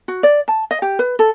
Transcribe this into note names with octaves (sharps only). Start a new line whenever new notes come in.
F#4
D5
A5
D#5
G4
B4
A4